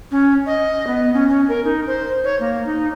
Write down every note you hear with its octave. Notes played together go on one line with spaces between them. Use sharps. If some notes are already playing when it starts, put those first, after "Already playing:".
C#4
D#5
B3
C#4
C#4
A#4
D#4
C5
C#5
A#3
D#4